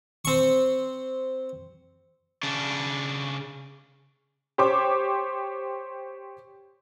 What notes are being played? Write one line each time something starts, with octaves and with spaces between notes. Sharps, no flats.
C4 C#6
C#3 D4
G4 C5 C#5 D6